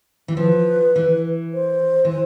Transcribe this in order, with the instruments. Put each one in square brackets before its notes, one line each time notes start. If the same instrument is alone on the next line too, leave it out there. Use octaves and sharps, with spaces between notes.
[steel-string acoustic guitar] E3
[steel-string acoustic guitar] F3 [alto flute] B4
[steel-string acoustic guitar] E3
[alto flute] C5
[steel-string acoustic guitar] E3